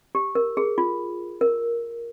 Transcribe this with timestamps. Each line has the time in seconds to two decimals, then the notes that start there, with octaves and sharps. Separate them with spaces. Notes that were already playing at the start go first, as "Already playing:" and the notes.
0.15 G4
0.35 A#4
0.57 G#4
0.78 F4
1.41 A#4